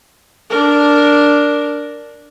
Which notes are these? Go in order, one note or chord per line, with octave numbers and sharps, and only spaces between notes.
D4 A#4